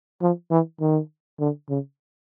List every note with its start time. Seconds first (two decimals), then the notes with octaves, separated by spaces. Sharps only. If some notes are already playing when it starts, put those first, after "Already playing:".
0.22 F3
0.51 E3
0.81 D#3
1.40 D3
1.69 C#3